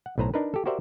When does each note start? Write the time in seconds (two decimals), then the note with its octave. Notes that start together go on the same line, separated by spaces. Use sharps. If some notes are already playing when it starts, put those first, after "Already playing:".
0.06 F#5
0.18 B1 A2 B4 C5 A#5
0.34 D4 D#4 A#4 B4
0.54 G4 A4
0.66 F#4 G4 A#4 C5 D5 E5